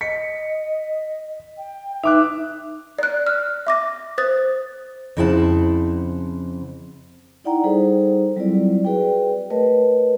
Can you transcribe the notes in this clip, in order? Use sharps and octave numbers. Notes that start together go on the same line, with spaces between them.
D#5 B6 C#7
G5
D#4 B4 E5 D6 F#6
D5 F#6
F6
E5 D6 A#6
C5 D#6 A6
F2 C#3 E4 C5 F#5 A5
D#4 E4 D5 F#5 G5 A#5
G3 D#4 G#4 A4 C5
F#3 G3 C4 E4 F4 D5
F#4 G#4 B4 D5 G5
A3 A#4 B4 C#5 D#5